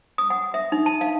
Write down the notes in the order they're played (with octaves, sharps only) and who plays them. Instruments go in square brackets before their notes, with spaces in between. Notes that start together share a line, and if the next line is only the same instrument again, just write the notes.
[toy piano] D#6
F#5
E5
D#4
A5
F5